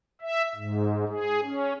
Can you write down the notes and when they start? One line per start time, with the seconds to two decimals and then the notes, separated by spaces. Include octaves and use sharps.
0.21 E5
0.55 G#2
1.08 G#4
1.42 C#4